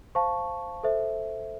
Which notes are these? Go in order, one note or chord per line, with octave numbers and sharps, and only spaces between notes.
C5 F5 A5 C#6
A4 C5 E5